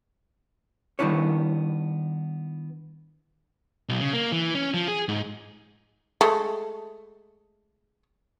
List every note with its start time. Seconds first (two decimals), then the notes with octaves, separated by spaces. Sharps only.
0.99 D#3 G3 B3 D4 E4 C#5
3.89 B1
4.01 C#3
4.13 A#3
4.32 E3
4.55 C#4
4.74 F3
4.88 G#4
5.08 G#2
6.21 G#3 A3